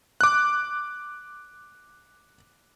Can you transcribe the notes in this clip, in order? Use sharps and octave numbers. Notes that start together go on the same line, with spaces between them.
D6 F#6